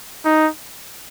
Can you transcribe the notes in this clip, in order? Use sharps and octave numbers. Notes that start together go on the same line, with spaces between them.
D#4